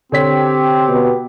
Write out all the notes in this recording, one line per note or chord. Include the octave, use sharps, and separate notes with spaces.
D3 C4 G4 C#5 B6
B2